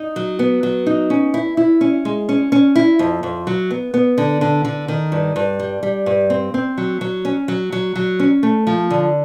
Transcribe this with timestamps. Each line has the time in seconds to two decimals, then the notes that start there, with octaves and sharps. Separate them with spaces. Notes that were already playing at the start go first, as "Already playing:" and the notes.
Already playing: D#4
0.16 F#3
0.39 B3
0.63 F#3
0.86 D#4
1.10 C#4
1.34 E4
1.57 E4
1.81 C#4
2.05 G#3
2.29 C#4
2.52 C#4
2.76 E4
2.99 F2
3.23 F2
3.47 F#3
3.71 B3
3.94 B3
4.18 D3
4.41 D3
4.65 D3
4.88 D#3
5.12 G2
5.36 G2
5.59 G3
5.83 G3
6.06 G2
6.30 C4
6.54 C4
6.78 F#3
7.01 F#3
7.25 C#4
7.48 F#3
7.72 F#3
7.96 F#3
8.19 C#4
8.43 A3
8.67 F3
8.90 D3